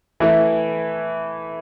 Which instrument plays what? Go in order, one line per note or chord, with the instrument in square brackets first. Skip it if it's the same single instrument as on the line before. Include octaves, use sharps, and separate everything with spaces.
[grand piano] E3 A3 E4